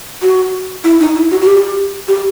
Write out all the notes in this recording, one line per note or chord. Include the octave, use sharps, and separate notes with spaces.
F#4
E4
D#4
E4
F#4
F#4
G4
G4